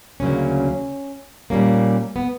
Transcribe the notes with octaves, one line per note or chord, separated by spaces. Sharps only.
D2 C#3 F#3 A#3 C#4
A#2 G3 A#3 C#4
B3